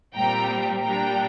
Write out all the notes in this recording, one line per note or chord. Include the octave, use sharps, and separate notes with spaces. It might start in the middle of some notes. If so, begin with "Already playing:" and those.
A#2 G3 C4 G5 A#5
A#2 G3 D4 G5 A#5